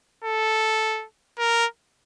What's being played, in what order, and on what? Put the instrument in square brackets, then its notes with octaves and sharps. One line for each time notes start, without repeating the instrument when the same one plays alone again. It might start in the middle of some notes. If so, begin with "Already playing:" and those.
[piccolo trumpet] A4
A#4